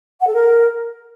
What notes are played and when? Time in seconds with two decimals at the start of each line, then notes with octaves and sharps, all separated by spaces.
0.21 F#5
0.27 A4
0.34 A#4